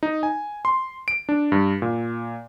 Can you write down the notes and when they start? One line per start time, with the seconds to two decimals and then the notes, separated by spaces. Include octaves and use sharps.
0.03 D#4
0.23 G#5
0.65 C6
1.08 D7
1.29 D4
1.52 G2
1.82 A#2